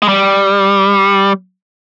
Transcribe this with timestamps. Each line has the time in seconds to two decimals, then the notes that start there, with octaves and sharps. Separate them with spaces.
0.02 G#3
0.08 G3